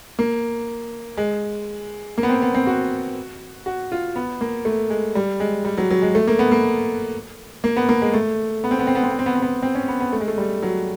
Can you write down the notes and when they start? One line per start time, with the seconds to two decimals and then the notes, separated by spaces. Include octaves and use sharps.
0.19 A#3
1.17 G#3
2.18 A#3
2.23 B3
2.29 C4
2.42 B3
2.54 C4
2.67 F#4
3.66 F#4
3.92 F4
4.16 B3
4.41 A#3
4.65 A3
4.90 G#3
5.15 G3
5.40 G#3
5.65 G3
5.78 F#3
5.91 F#3
6.02 G#3
6.15 A3
6.28 A#3
6.39 B3
6.51 A#3
7.64 A#3
7.76 B3
7.89 A#3
8.02 G#3
8.13 A3
8.64 B3
8.71 C4
8.79 B3
8.87 C4
8.95 B3
9.03 C4
9.11 B3
9.19 C4
9.26 B3
9.35 C4
9.42 B3
9.63 C4
9.75 C#4
9.88 B3
10.00 B3
10.12 A3
10.20 G#3
10.28 A3
10.38 G3
10.63 F#3